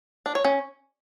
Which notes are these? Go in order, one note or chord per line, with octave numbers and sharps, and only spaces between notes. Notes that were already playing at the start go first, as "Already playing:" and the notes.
D4
C#5
C#4